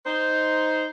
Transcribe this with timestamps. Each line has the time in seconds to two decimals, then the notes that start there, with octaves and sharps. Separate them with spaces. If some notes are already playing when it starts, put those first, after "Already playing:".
0.06 D#4 C5